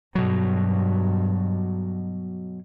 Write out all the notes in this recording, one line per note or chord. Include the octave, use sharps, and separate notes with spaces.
G2 B2 F#3